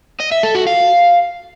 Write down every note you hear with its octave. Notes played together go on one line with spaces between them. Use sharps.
D#5
E5
A4
F#4
F5